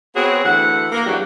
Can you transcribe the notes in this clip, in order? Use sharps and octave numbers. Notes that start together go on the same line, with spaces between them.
B3 C4 F#4 G#4 C#5
D2 E3 F#5
A#3
E2 G2 F#3 F#4 G4